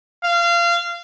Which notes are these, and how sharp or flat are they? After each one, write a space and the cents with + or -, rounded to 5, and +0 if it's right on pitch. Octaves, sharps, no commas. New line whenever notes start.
F5 -25